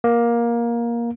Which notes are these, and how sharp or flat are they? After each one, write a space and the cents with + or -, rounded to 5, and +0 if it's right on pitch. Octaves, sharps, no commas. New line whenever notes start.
A#3 +15